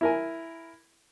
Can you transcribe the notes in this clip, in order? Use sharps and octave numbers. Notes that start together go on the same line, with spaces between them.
E4 A#4 G#5